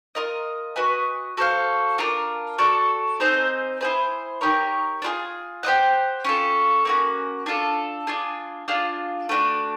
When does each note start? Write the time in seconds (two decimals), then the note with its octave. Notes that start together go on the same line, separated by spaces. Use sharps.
0.15 F4 A#4 D#5
0.76 F#4 B4 D#5 G#5
1.37 F#4 A4 C5 F5
1.98 D4 F4 A#4
2.58 F#4 A4 D5
3.20 C4 D#4 G#4 C5
3.81 E4 G#4 C5
4.41 D#4 G4 A#4 C#5
5.02 D4 F4 G#4
5.63 G4 C5 D#5 F#5
6.24 C#4 F4 A4
6.85 A#3 C#4 F#4
7.46 D4 F4 A4
8.07 D4 F4 G#4
8.68 D4 F4 G#4
9.29 A3 D4 F#4